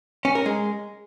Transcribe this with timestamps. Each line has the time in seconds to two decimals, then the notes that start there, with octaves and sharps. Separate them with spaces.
0.25 C#4
0.35 A#4
0.46 G#3